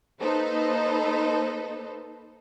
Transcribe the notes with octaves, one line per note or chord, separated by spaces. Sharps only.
A#3 D#4 A4 B4 C5